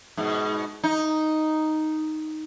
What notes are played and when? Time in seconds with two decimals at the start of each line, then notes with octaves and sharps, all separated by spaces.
0.17 G#2 B2
0.84 D#4